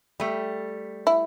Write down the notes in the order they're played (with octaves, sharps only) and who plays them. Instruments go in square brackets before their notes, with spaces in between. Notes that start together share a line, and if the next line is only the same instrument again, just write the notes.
[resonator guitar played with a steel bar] G3 A3
[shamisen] E4